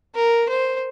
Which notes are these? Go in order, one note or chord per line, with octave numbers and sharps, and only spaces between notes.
A#4
C5